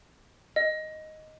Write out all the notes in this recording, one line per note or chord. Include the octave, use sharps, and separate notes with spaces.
D#5